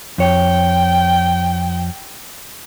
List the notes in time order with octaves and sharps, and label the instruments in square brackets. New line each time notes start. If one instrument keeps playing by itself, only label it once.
[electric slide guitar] F2 C#5 [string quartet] G5